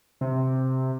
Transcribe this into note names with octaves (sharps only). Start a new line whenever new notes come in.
C3